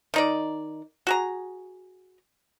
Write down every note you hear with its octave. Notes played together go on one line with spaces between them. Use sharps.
D#3 D#4 D5
F#4 G#4 A#5